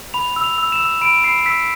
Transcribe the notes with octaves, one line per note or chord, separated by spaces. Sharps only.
B5 F7
E6
F7
E6
E7
E6
B5 D7
B5 C7
E6 B6